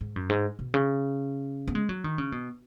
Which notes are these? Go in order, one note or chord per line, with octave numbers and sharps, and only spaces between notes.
G#2
F#2
G#2
B2
C#3
B3
G#3
F#3
D#3
C#3
B2